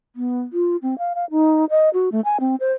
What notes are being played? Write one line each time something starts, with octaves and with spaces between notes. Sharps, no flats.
B3
F4
C4
F5
F5
D#4
D#5
F#4
A3
G#5
C4
C5